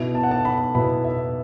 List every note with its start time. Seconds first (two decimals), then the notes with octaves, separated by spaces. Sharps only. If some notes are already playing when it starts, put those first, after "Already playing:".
Already playing: B2 B3 E4
0.15 A5
0.23 F#5
0.31 A5
0.45 B5
0.75 B2 B3 E4 B5
1.04 E5